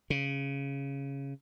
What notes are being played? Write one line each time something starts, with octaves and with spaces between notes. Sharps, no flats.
C#3